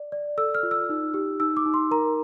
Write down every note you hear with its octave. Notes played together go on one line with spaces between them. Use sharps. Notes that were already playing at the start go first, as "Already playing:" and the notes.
Already playing: D5
D5
A4 E6
F6
F4
E6
D#4
G4
D#4 E6
D6
D#4
C6
A#4 A#5